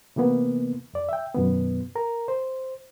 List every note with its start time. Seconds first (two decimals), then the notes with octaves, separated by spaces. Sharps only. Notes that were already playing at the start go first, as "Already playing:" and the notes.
0.16 C3 E3 A#3 B3
0.94 F2 D5
1.09 E5 G5
1.34 F#2 B2 D#3 B3
1.96 A#4 A#5
2.28 C5